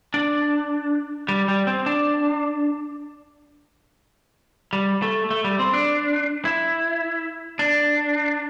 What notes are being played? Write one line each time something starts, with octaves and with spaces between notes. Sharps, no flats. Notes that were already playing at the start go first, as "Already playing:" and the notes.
D4
G3
G3
C4
D4
G3
A3
A3
G3
C4
D4
E4
D4